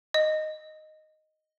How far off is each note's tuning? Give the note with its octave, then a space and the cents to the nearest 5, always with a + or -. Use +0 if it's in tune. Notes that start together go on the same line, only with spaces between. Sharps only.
D#5 -5